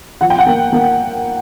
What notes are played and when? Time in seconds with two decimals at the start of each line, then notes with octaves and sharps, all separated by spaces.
0.21 F3 F#5
0.30 G5
0.38 F#5
0.47 A#3
0.73 A#3